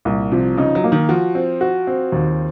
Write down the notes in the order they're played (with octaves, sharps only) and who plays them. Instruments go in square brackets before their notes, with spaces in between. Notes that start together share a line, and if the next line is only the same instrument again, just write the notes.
[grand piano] C2 [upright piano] A#2
[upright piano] C3 [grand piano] F3
[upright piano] C#3 [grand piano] D#4
[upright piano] F#3
[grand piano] A#3
[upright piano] D#3
[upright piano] F3 [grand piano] F#4
[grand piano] C4
F#4
C4
D#2